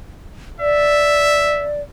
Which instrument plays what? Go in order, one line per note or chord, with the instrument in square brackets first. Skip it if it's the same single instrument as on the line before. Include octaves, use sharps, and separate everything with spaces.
[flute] D5 [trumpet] E5